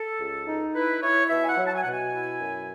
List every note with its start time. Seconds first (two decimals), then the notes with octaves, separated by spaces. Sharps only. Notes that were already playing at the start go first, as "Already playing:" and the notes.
Already playing: A4
0.20 C#2
0.47 D#4
0.74 E4 B4
1.02 E4 C#5
1.29 B2 E5
1.44 G#5
1.48 F#5
1.57 F#3
1.67 A5
1.75 G#5
1.82 B2 F#5
1.91 G#5
2.12 E4
2.40 F#2